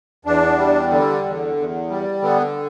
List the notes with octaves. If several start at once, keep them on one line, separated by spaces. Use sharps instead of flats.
E2 D4
G3
D3
E2
E2
G3
D3 B3